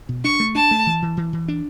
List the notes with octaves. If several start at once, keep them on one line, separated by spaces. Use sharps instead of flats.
B2
D4 C#6
A3
D4 A5
A3
E3
E3
E3
E3
D4